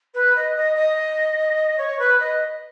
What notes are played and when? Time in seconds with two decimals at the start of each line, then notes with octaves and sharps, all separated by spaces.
0.14 B4
0.35 D#5
0.56 D#5
0.75 D#5
1.77 C#5
1.99 B4
2.19 D#5